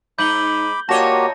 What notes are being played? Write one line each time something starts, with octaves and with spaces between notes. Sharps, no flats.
G#2 D#4 B5 D6 G6 F#7 G7
A#2 A#3 F#4 G4 C#5 D#5 A5 A#6